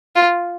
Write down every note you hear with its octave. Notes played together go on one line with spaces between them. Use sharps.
F4